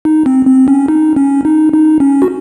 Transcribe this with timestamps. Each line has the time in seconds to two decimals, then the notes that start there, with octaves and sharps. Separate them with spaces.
0.05 D#4
0.26 C4
0.47 C4
0.68 C#4
0.88 D#4
1.16 C#4
1.45 D#4
1.72 D#4
2.00 C#4
2.22 F#4